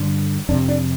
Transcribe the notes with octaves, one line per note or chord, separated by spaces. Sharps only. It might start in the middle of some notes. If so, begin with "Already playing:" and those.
Already playing: G2 D3
F2 C3 D4
D4